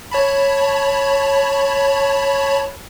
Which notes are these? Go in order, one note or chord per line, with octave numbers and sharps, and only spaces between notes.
C#5 A5 B5